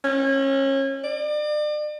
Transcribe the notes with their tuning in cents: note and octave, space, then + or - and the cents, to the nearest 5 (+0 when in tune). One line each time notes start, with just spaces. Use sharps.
C#4 -30
D5 +35